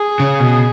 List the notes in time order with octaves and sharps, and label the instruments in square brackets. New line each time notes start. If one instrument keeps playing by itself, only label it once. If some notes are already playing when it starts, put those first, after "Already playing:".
Already playing: [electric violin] G#4
[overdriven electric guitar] C#3
B2